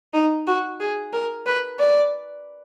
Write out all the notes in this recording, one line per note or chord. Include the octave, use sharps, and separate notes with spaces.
D#4
F#4
G#4
A#4
B4
D5